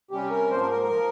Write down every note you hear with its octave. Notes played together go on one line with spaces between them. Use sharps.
C3 G3 C#4 G4
A#4
G#2 F3 A#3 C5
A#4
A#4
A#4
F3 A#3